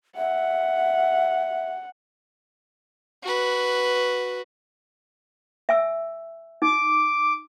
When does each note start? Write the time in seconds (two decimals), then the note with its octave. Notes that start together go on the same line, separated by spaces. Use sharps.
0.17 E5 F#5
3.23 F#4 B4
5.69 E5 G#5 E6
6.62 D#4 D6